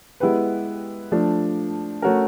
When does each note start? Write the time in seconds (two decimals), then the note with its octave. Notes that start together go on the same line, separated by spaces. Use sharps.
0.20 G#3 B3 E4 G4 B4
1.12 F3 A3 D4
2.02 A3 C#4 F#4 A#4